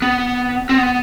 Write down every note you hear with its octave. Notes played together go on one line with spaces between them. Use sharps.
B3
C4
B3